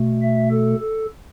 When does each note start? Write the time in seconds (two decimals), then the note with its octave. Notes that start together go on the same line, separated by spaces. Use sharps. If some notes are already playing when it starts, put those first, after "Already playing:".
Already playing: B2 A3
0.22 E5
0.50 A4
0.80 A4